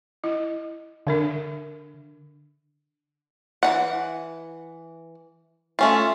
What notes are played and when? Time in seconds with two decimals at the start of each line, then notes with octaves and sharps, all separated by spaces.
0.24 E4 D#5
1.07 D3 D4 A#4 E5
3.63 E3 D#4 F#5
5.79 A3 C#4 F4